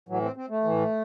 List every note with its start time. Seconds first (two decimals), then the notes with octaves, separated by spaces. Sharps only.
0.09 A2 E3 F#3
0.22 C4
0.36 C4
0.49 A3
0.64 A2 E3